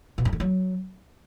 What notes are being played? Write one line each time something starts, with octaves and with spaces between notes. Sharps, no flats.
B2
G2
D3
F#3